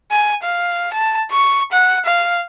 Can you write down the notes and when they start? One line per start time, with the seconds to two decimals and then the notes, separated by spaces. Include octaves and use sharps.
0.11 G#5
0.43 F5
0.93 A5
1.31 C#6
1.72 F#5
2.05 F5